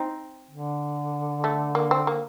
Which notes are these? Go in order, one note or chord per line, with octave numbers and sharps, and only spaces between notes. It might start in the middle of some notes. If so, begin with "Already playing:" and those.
Already playing: C4 D#4
D3
A3
A#3
C4
A#3